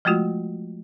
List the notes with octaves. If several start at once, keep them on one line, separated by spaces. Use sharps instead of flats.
F3 G#3 A3 F4 F#4